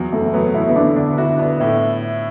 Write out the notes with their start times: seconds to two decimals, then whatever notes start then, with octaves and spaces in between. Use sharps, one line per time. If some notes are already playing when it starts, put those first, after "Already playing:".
Already playing: E2 F#3
0.12 F#1 A3
0.33 F#3 B3
0.54 B2 E4
0.69 B3
0.75 D3 D4
0.96 D2 D4
1.18 E4 F#4
1.39 B3 D4
1.60 A2 E4